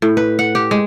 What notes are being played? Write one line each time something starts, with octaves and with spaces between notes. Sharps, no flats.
A2
B4
F#5
G4
G#3